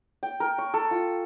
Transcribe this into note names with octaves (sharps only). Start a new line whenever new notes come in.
G5
A#4
C#6
A4
F4